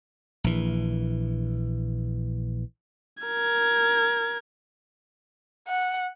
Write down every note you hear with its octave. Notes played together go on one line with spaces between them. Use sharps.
A#1 E3
A#4 G#6
F#5